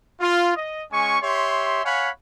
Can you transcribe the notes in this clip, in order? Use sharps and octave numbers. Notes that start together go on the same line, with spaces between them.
F4
D#5
G#3 C#4 G#5 C#6
G4 C#5 E5 C6
C#5 F5 F#5 G#5 B5